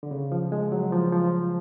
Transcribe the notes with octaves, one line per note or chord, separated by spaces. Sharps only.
D3
C#3
F3
G#3
F#3
F3
F3